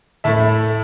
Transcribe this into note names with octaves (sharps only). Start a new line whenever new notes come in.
A2 A3 E5 A5